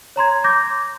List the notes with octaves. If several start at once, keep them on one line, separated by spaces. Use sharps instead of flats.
C#5 A#5 C6 G#6
D6 G6 A#6